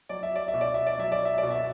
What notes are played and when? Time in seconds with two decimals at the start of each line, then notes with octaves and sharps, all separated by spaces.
0.09 F#3 D5
0.23 E5
0.36 D5
0.48 E5
0.54 B2
0.61 D5
0.74 E5
0.87 D5
0.98 F#3 E5
1.12 D5
1.25 E5
1.38 D5
1.43 B2
1.50 E5